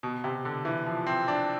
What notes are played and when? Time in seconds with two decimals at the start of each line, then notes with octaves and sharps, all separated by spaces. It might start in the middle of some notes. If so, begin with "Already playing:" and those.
0.03 B2
0.24 C3
0.45 D3
0.65 E3
0.86 F3
1.07 C4
1.28 D4